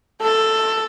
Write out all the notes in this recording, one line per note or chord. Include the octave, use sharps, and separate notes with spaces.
A4